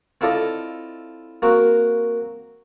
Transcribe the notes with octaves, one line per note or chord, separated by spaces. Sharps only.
C4 E4 F4 A4 D5 D#5
A#3 C4 F#4